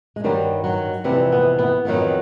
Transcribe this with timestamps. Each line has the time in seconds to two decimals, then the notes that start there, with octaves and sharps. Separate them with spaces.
0.16 G#3
0.24 G2 D#3 F#3 G3
0.64 F#3
1.04 F2 C3 E3 G3
1.32 B3
1.59 B3
1.85 F2 C3 D#3 F#3 B3